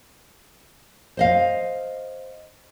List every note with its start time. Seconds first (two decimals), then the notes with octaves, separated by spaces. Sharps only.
1.17 C5 D#5 F5